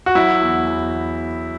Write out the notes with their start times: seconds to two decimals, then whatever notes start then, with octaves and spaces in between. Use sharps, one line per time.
0.06 F#4
0.15 F#3 E4
0.41 E2
0.67 E2